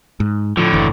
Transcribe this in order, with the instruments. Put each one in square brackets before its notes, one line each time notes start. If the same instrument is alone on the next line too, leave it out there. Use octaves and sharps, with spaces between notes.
[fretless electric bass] G#2
[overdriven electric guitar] A2 D3 [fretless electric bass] F3
[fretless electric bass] F#1 E3